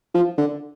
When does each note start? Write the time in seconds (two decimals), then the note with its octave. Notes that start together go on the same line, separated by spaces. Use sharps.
0.15 F3
0.38 D3